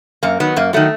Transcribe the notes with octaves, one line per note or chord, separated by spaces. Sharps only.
F#2 A#3
D#3 F#3 B3
F#2 A#3
D#3 F#3 A3